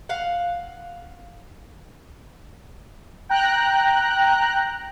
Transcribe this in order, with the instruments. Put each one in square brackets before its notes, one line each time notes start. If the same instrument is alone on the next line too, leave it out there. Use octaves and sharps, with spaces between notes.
[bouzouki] F5 F#5
[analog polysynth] G5 A#5 F#6